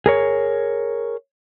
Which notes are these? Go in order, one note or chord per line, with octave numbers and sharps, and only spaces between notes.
G#4 A#4 C#5